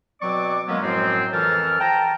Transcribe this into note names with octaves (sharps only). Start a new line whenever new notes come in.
B2 F#3 C4 D5 C#6 D6
D#3 F#3 G#3 A#3 B3 C#4
F#2 A2 F3 F#3 G#3 C4
F2 E3 A4 A#4 A5 F6
G5 A5 A#5